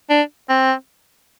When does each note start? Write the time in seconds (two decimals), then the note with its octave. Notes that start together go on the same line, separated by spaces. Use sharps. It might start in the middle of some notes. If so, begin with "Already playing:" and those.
0.10 D4
0.49 C4